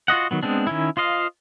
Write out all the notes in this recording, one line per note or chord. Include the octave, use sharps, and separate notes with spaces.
F4 F#4 D#5 F#5
D#3 F#3 B3
G#3 B3 C4 D4
D#3 C#4 E4
F4 C5 D#5 F5